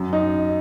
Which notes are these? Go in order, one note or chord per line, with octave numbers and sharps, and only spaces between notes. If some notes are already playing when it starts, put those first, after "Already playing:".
Already playing: F#2
D#4